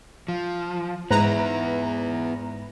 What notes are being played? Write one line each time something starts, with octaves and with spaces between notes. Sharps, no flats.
F3
G#2 B3 E4 B4 A#5